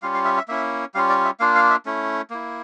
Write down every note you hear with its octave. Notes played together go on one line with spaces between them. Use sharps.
G3 C#4 F4 F5
F5
E5
E5
A#3 C#4 E4 E5
G3 C#4 F4 F5
D5
E5
A#3 D4 F4 F5
F5
E5
A3 C#4 E4
A#3 E4